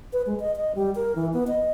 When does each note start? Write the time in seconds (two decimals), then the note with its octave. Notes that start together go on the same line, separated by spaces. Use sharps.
0.13 B4
0.26 G#3
0.40 D#5
0.56 D#5
0.75 G3
0.95 A#4
1.16 E3
1.33 B3
1.47 D#5